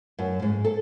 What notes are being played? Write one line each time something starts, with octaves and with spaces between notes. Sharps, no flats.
F#2
G#2
A4